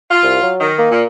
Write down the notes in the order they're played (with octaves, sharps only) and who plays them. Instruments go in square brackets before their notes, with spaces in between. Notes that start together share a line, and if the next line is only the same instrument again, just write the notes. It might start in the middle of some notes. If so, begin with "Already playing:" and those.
[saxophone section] F4
[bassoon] C2
F#3
[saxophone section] D#3
[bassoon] A#3
[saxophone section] A#2